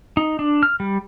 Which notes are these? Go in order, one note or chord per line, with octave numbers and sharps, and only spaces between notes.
D#4
D4
F6
G3